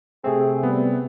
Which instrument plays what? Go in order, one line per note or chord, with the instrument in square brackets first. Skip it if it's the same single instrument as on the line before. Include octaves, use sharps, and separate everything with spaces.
[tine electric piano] C3 A3 C4 [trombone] G#4
[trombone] G3 [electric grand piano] B3